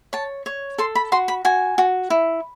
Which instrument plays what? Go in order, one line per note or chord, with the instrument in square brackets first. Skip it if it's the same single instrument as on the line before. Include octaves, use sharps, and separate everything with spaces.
[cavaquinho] C#5 A5
C#5
A4 C6
B5
F#4 C6
B5
F#4 G#5
F#4
E4